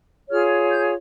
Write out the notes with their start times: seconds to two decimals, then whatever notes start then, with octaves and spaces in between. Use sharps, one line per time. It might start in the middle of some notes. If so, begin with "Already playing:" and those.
0.29 F4 G#4 C#5 F6
0.69 G6